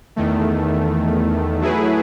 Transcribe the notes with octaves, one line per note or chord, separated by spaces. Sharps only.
E2 D#3 A3
F#3 A3 E4 G#4 B4